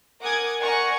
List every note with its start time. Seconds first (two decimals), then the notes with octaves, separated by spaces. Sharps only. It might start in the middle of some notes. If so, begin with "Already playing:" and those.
0.21 A#4 F#5 G#5 D6 D#6 G#6
0.61 A#4 D5 F#5 G#5 A#5 C#6